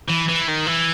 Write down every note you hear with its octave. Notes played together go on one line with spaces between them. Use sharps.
E3
E3
D#3
E3